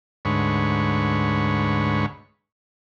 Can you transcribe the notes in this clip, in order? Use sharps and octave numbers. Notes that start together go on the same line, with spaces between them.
D2 G#2 B4 C#5